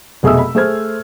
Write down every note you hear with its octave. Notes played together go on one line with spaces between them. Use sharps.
F1 B2 G#4 D#5 E5 E6
B5
A3 G#4 C5 F6 G#6